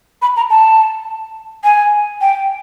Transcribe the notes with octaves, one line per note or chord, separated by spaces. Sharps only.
B5
A#5
A5
G#5
G5